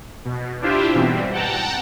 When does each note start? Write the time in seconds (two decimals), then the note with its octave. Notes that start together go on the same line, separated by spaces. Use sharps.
0.25 B2
0.61 D4 E4 F4 G4 C5 E5
0.93 G#2 B2 E3 G3 C4
1.32 F#5 G5 A5 A#5